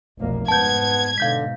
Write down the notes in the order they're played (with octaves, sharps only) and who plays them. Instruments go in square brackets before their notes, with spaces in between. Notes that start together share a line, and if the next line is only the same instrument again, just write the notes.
[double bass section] F1 B1 A#3
[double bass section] G#2 [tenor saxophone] B3 [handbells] A5 G6 [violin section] G#6
[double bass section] G#2 B2 [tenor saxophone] D3 [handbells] F5 G6 B6